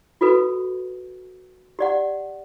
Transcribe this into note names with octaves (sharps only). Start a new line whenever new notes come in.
F4 F#4 A4 B4
G4 D5 F#5